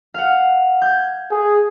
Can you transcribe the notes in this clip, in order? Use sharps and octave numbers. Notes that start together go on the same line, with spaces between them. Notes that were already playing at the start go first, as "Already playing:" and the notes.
F5 F#5
G6 G#6
G#4